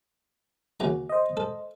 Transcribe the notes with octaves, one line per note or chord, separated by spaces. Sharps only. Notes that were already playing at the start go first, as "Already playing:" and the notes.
D#2 C#3 F#4 A#5
C5 D#5
A4